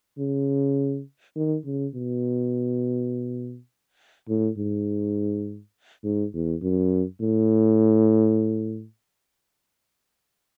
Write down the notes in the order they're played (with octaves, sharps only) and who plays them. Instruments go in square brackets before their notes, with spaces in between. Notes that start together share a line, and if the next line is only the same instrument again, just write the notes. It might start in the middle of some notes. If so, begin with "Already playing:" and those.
[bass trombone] C#3
D#3
C#3
B2
A2
G#2
G#2
E2
F#2
A2